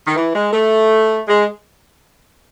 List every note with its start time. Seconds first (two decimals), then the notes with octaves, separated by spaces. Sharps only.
0.06 D#3
0.16 E3
0.34 G#3
0.52 A3
1.28 G#3